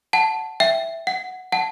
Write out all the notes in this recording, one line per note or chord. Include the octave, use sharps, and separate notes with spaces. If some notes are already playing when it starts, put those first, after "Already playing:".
F#5 A5
E5 G5
F#5
F#5 A5